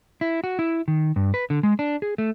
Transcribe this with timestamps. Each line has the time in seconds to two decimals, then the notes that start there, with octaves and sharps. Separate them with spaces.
0.21 E4
0.44 F#4
0.59 E4
0.88 D#3
1.16 G2
1.34 B4
1.50 D3
1.63 G#3
1.79 D4
2.02 G#4
2.18 A3